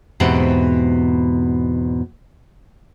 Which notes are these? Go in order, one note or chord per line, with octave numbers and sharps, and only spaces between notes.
E2 G#2 B2 C4 G4 F#5